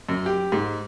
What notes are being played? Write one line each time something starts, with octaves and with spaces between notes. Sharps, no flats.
F#2
G4
G#2